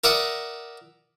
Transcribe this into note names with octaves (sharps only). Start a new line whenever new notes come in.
A#4 D5 E5 F#5 A#5 D#6